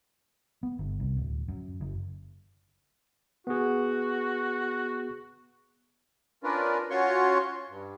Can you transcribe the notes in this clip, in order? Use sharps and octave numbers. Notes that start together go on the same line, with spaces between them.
B3
G1
C2
D1
F#2
F#1
B3 F#4 G#4
C#4 D4 F4 A#4 B4
C#4 F4 F#4 C#5 C6 C#6
G2